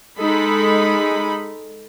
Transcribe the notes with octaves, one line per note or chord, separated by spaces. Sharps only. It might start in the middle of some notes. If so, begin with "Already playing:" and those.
G#3 D#4 A4 B5